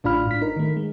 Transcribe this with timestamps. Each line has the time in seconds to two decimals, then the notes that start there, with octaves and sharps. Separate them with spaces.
0.04 A1 A2 D4 F4 B5 F6
0.27 G#2 B6
0.41 D#4 A#4
0.56 D#3 A3
0.77 G#3